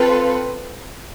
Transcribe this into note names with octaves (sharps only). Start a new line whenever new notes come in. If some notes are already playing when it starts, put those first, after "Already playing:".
Already playing: C4 F4 A4 B4